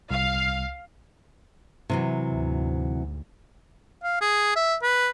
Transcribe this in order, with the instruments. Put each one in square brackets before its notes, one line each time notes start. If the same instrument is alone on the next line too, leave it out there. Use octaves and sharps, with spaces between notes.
[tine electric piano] C2 [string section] F5
[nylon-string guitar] C3 E3 F#3
[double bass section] D2 G#2
[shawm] F5
G#4
E5
B4